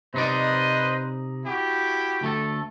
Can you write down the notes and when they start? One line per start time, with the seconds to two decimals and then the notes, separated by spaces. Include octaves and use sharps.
0.14 C3 D#4 B4 C5 D5 D#5
1.45 E4 F#4 G4
2.21 D2 A3 A4